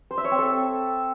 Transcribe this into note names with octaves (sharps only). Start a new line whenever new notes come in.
C5
E5
C#5
C4
A4